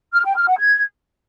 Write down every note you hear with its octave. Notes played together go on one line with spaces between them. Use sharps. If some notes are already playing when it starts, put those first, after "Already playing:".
F6
G5
F6
F#5
G#6